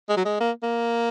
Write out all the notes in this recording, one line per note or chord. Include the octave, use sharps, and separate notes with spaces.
G#3
F#3
G#3
A#3
A#3